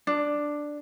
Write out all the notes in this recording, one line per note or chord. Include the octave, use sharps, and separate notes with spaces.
D4